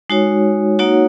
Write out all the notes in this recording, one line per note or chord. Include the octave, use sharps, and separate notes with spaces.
G#3 D#4 F#4 C#5
A#3 D#4 F#4 C#5 F#5